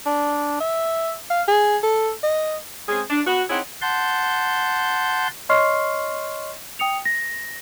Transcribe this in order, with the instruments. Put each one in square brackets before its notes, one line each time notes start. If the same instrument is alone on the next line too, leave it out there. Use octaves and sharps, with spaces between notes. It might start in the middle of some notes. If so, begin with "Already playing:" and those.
[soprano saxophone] D4
E5
F5
G#4
A4
D#5
[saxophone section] G#3 C4 C#4 G#4
D4
B3 F#4
C4 D#4 E4 G#4 C#5 F#5
[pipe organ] F#5 A5 C6 G6
[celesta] C#5 D#5 C6 C#6 F6 C7
G5 D#6 C#7 F7
A#6